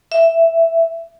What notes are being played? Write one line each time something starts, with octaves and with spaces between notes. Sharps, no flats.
E5